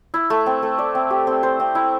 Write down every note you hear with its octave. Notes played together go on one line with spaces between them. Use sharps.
E4
A3
C4
A3
D5
C4
G4
C4
C5
C4
E4